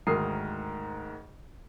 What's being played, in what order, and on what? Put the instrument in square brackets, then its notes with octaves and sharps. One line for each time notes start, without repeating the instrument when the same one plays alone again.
[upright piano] D2 G#2 D#3 A#4 D#6 C7